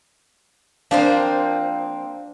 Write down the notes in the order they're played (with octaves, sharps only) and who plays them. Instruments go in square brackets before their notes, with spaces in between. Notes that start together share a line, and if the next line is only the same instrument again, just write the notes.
[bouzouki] F3 A#3 C4 [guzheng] D4 C5 [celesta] F5